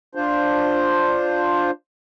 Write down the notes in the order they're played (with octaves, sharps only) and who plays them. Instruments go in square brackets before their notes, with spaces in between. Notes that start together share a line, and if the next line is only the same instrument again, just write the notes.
[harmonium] D4 F4 C5